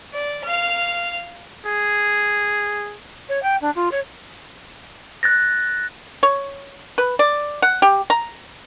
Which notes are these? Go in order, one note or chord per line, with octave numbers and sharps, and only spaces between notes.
D5
F5 F6
G#4
C#5
G5
D4
F4
C#5
F#6 A6 A#6
C#5
B4
D5
F#5
G4
A#5